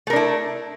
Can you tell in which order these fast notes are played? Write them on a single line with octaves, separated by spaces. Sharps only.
A3 A#4 D4 E4